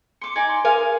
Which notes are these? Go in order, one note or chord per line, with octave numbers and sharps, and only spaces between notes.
C6 D6 C#7
D#4 D5 G#5
C6
G#4 A#4 F5 G#5
A#4